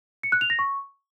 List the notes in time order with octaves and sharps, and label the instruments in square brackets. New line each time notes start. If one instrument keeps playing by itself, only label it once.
[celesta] C#7
F#6
F7
A#6
C#6